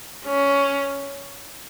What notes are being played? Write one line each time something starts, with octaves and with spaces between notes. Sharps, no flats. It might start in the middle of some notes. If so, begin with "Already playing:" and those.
C#4